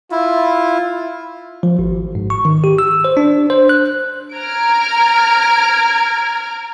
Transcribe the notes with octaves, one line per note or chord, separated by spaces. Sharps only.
E4 F4
F3
G#1
G#2
C#6
D#3
G4
E6
C5
D4
C5
F#6
A#5 F6 G#6 D7